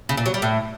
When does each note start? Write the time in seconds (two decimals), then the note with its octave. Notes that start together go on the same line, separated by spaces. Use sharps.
0.09 C#3
0.17 A#2
0.26 F#3
0.34 G3
0.42 A2